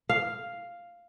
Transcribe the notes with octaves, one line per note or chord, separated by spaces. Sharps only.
F5